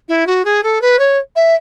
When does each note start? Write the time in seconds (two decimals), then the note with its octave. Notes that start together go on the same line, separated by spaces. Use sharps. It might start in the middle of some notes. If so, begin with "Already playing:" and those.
0.08 E4
0.27 F#4
0.45 G#4
0.63 A4
0.81 B4
0.99 C#5
1.36 E5